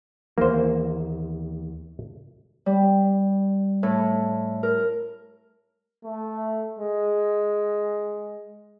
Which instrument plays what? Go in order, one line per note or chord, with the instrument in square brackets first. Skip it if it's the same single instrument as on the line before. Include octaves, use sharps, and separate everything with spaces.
[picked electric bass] D#2 E3 [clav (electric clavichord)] A#3 C5
[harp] G3
A2
A#4
[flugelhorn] A3
G#3